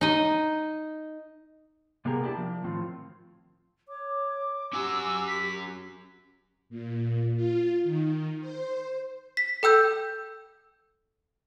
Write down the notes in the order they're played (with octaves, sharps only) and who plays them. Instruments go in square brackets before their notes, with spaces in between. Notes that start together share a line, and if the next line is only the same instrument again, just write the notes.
[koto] D#4 D#5
[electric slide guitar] C3 A#3 B3 G4 G#4 A#4
D4 E4 G4
F3
A2 D#3 C4 F4
[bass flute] C#5 [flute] D6
[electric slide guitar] C#4 F#4 G#5 [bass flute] G4 [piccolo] E6
[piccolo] B6
[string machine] A#2
F4
D#3
C5
[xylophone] B6
A4 G5 E6 G6